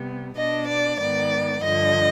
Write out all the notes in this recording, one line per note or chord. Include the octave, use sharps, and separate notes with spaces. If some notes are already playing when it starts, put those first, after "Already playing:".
Already playing: C3 G3 B3
B2 B3 D4 D#5
D5
G#2 D#3 B3 D5
G2 D3 F3 D#5